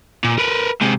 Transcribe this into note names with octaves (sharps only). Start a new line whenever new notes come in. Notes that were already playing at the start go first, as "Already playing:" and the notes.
A#2
A#4 B4
G#2 C3